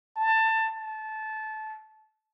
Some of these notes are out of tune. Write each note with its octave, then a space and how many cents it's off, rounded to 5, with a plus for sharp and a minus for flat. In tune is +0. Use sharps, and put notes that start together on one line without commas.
A5 +20
A5 -20